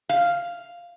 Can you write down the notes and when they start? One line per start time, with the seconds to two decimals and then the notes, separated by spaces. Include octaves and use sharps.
0.09 F5